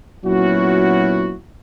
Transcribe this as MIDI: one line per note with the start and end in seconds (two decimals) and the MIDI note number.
0.25 1.35 46
0.25 1.35 54
0.25 1.35 59
0.25 1.35 61
0.25 1.35 64
0.25 1.35 66